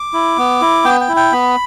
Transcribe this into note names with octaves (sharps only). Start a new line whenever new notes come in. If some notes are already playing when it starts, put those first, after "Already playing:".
Already playing: D6
E4
B3
E4
B3 G5
G5
E4
G5
B3 B5